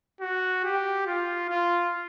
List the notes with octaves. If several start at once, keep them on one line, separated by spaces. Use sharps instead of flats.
F#4
G4
F4
F4